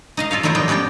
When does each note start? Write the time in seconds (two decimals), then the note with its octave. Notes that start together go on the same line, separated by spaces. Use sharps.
0.17 D#4 D#5 F5
0.31 F4 A4 C#5 F5
0.43 F#3 A3 E4 F4 A#4 C5
0.55 F3 G3 B3 D#5 G5
0.68 B3 C#4 G4 D5 G5